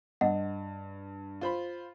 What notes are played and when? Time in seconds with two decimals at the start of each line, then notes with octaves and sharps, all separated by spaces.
0.21 G2 D#5 F#5
1.41 F4 C5 B5